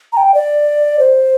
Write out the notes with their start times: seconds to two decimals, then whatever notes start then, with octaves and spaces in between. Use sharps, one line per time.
0.13 A#5
0.17 G5
0.34 D5
0.99 C5